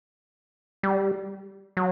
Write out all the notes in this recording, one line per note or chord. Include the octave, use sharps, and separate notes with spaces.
G3
F#3